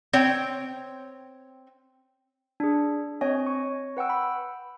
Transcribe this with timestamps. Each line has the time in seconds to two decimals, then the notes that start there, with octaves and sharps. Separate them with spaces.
0.13 C4 C#5 G5
2.60 D4 G#4
3.21 C4 C#5 D#5 G#5
3.47 C#6
3.97 B4 F#5 G5 E6
4.10 B5